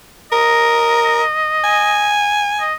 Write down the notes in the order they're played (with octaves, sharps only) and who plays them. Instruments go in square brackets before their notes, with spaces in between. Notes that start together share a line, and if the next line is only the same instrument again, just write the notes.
[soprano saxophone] A#4 [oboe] D#5
[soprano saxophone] G#5
[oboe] D#5